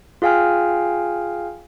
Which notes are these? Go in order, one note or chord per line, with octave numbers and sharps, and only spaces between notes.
F4 G#4 F5 G5 G#5 F6